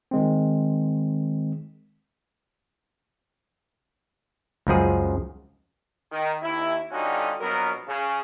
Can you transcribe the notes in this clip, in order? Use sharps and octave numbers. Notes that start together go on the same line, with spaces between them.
D#3 G#3 C4
C#2 F#2 F3 G#4
D#3
D#2 E4
D3 G3 C#4 D#4 F4 F#4
A#1 B2 F#3 B3 A#4
C#3